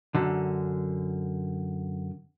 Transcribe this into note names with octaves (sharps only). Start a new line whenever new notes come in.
F#2 D3